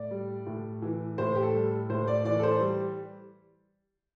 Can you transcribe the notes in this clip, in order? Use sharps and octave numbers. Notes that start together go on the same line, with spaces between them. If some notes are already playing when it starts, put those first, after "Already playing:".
Already playing: A2 D5
G3
A2
E3
A2 C5
G4
A4
G3
A2 C5
D5
E3 D5
A4
C5
G3